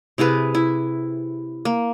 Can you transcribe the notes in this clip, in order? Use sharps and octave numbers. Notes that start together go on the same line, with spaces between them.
C3 E4 G#4 B4
E4
A#3